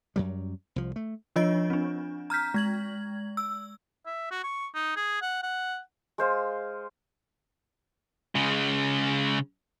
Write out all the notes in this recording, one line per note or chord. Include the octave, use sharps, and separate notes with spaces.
F#2 F#3 G3
C2 F3
A3
F3 D4 F4 C#5 D#5 D7
C4 D4
A#5 F6 G6 B6
G#3 G#6 F#7
E6
E5
F#4
C#6
D#4
G#4
F#5
F#5
G#3 C5 F5
C#3 G#3